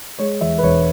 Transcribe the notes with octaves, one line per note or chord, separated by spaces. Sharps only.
G#3 C#5
E2 E5
B4
E1 C#5